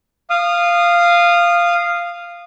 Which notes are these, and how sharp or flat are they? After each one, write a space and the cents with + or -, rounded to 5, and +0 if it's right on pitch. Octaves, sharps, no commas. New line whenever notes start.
F5 -5 D#6 -25